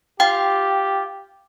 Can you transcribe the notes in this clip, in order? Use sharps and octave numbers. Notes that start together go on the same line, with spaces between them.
F4 G4 G5